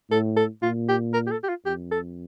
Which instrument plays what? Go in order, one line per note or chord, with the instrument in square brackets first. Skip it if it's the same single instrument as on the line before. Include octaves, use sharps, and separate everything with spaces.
[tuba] A2 [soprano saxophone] A4
[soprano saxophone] A4
[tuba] A#2 [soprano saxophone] F4
[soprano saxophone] G4
A#4
G4
A4
G4
F4
[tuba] F2 [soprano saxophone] G4
[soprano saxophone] A4